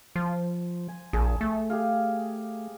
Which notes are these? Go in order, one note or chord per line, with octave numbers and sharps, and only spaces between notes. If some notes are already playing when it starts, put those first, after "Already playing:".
F3 C5
G#5
A#1 G#4 A5
A3
G4 G#4 F5